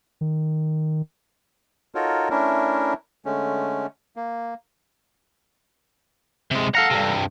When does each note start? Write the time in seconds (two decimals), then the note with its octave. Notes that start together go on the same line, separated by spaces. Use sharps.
0.21 D#3
1.95 D#4 F4 F#4 A4 A#4 C#5
2.30 A3 C#4 D4 E4 A#4
3.25 D3 G#3 A3 C#4
4.16 A#3
6.51 C3 G#3
6.75 A4 F5 F#5 A#5
6.91 G2 C3